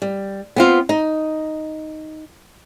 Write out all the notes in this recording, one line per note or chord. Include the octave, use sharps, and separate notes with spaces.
G3
B3 C4 F4
D#4